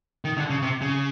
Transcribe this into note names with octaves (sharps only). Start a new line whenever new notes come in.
D#3
D3
C#3
C3
C#3